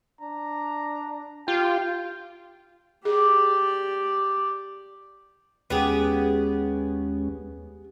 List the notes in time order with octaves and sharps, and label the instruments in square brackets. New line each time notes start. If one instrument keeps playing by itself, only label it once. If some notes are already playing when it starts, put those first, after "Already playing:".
[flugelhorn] D4 [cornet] A#5
[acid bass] F4 [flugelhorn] G4 [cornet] G5
[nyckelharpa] G4 D5 [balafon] G#4
[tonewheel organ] D#2 G#3 C#4 [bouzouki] B3 G4 G#4